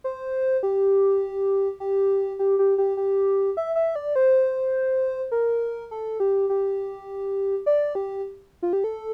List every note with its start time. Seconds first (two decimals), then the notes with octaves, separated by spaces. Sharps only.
0.04 C5
0.63 G4
1.80 G4
2.39 G4
2.59 G4
2.78 G4
2.97 G4
3.57 E5
3.76 E5
3.96 D5
4.16 C5
5.32 A#4
5.91 A4
6.20 G4
6.50 G4
7.66 D5
7.95 G4
8.63 F4
8.73 G4
8.84 A4